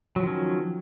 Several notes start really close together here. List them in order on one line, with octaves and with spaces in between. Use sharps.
F#3 F3 D#3 C#4